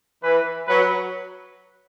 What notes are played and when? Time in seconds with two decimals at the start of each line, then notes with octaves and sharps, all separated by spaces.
0.23 E3 B4
0.67 F#3 B4